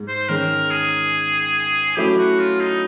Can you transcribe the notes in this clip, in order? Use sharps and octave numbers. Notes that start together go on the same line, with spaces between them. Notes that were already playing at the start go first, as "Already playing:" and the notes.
Already playing: G#2
C5
G#2 D#3 G#3 C#4 A#4
G#4
F#3 A3 C#4 E4 G4
F#4
F4
D#4